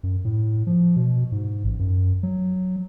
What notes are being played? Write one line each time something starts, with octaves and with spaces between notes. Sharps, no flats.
F#2
A2
F3
B2
G#2
A1
F#2
F#3